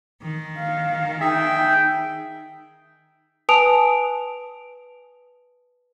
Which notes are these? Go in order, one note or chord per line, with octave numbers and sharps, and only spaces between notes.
D#3
F5
D#4 G#4 E5 G5
B4 G#5 A5 D#6 D7 F7